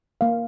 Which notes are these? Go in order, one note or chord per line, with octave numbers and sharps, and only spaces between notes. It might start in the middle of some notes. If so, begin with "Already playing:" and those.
A#3 F5